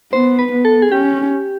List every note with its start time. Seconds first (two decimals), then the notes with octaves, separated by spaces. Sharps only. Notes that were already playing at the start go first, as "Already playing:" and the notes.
0.12 B3 C5
0.39 B4
0.51 B3
0.65 A4
0.82 G#4
0.91 C#4 G4